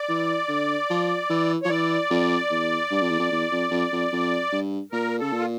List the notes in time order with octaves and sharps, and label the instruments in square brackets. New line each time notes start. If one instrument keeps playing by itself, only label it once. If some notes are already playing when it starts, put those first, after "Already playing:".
Already playing: [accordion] D5
[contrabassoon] E3
D3
F3
E3
[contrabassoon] F3 [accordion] C#5
[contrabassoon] E3 [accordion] D5
[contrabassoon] F2
E2
G2
F2
E2
F2
E2
F2
F2
F2
F2
G2
[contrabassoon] A#2 [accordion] A#4
[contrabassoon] C#3 [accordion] A4
[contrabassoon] A#2
[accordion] F4